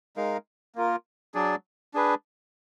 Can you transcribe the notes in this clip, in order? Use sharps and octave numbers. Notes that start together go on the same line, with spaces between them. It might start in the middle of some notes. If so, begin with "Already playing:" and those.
G#3 D#4 A#4 F5
A#3 F4 A#4
F#3 D4 G#4 D5
D4 G#4 B4